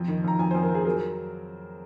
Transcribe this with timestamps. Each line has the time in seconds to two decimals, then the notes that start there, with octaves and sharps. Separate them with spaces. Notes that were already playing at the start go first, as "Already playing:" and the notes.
Already playing: F2
0.08 D#3
0.24 F2 A#5
0.39 F2 G#5
0.51 C5
0.55 F2
0.63 A#4
0.70 F2 G#4
0.85 F#3 A#4